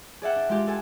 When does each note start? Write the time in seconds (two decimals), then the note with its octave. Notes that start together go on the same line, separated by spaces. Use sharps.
0.22 G#4 D5 E5 F#5 G5
0.36 D4
0.49 G#3 F4 G4
0.67 A4 F#5 G#5